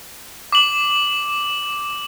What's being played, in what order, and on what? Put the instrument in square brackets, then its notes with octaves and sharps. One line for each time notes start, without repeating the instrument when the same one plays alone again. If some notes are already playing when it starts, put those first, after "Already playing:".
[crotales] D6 F#7